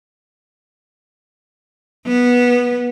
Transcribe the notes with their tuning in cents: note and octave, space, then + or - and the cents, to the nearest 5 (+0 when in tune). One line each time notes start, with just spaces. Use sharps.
B3 -15